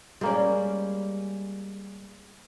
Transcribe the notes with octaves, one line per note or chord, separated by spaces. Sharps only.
G3 G#3 A#3 C#4 D5